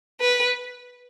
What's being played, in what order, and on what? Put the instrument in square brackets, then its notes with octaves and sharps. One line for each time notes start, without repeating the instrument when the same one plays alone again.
[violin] B4